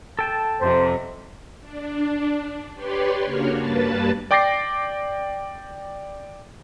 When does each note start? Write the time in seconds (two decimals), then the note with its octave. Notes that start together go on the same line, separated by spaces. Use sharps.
0.19 A4 G5 A5
0.61 F2 C3 C5
1.61 D4
2.74 G4 B4 C#5 D5 C6
3.25 C#3 A#3 D4 F#4 C#5 F6
3.57 G2 A#3 B4 A5 A6
4.31 D5 G5 D6 A6 A#6 C7